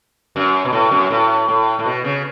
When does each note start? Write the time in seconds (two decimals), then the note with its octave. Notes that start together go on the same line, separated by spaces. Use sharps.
0.36 F#2
0.65 B2
0.73 A2
0.91 F#2
1.10 A2
1.48 A2
1.79 A2
1.86 B2
2.05 C#3